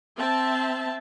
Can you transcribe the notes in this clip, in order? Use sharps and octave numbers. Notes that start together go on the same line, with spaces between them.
C4 E5 A5